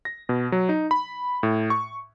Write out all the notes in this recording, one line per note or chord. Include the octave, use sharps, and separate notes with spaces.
A#6
B2
F#3
D#4
B5
A2
C#6